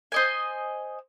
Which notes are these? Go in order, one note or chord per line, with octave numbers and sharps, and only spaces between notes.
C5 D#5 G#5